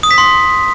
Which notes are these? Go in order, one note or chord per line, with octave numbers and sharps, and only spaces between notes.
D#6
B6
C6